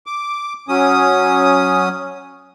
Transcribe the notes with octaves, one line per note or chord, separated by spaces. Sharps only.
D6
F#3 C#4 D#6